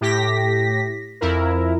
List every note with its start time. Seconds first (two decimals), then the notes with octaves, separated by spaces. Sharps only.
0.01 A2 G4 A#6 B6
1.21 F2 E4 A#4